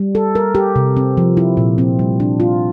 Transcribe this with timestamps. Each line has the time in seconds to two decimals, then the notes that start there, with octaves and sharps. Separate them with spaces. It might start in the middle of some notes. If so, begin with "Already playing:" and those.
Already playing: G3
0.15 A4
0.35 A#4
0.55 G4
0.76 C3
0.97 C4
1.17 F3
1.37 E4
1.57 A#2
1.78 C4
1.99 G3
2.20 D4
2.40 F4